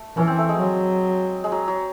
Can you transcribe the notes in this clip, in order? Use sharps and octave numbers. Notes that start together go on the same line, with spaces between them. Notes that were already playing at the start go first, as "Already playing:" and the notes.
Already playing: A3
E3 C#4
C4
A3
G#3
F#3
G#3
F#3
F#3